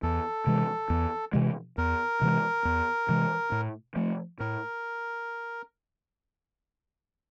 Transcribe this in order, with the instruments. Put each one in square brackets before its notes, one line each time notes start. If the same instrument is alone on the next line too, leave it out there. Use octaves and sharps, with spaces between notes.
[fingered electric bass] E2 [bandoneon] A4
[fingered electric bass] C3 E3 G#3
E2
C3 E3 G#3
[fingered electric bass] E2 [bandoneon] A#4
[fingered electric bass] C3 E3 G#3
E2
C3 E3 G#3
A2
F3 A3
[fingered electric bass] A2 [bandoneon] A#4